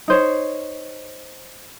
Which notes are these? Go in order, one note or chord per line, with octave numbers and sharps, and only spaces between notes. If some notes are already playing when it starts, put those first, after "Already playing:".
D#4 C5 C#5